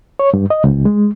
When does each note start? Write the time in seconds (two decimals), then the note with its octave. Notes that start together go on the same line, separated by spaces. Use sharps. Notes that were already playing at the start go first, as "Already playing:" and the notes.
0.19 C#5
0.33 G2
0.50 D#5
0.64 C#2
0.85 G#3